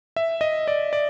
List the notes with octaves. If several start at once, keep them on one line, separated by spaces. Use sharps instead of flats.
E5
D#5
D5
D5